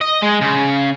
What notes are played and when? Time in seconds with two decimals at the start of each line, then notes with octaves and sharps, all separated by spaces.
0.01 D#5
0.23 G#3
0.41 C#3